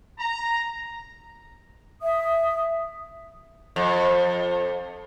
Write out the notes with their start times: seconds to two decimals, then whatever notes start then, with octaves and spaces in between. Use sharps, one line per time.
0.18 A#5
2.02 E5 D#6
3.76 F2